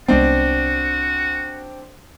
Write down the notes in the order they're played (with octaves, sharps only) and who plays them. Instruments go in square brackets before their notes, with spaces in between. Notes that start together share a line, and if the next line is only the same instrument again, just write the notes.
[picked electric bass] C2 G#3 B3 [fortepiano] C4 D4 [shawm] F#4